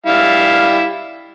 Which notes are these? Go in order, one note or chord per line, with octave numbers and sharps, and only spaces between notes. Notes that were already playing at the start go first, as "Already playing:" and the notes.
G3 E4 F5